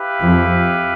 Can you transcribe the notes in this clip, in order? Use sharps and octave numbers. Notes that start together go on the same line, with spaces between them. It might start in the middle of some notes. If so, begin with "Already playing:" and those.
Already playing: E4 G4 B4 F5
F2